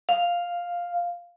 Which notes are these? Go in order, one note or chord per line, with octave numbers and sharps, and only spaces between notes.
F5